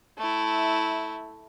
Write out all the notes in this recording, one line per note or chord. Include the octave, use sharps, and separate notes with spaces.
A3 E4